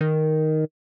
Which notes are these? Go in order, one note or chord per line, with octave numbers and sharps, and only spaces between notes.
D#3